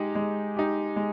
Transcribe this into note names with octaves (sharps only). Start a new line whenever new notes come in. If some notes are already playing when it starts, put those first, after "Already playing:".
Already playing: G#3 D#4 G4
G#3
D#4 G4
G#3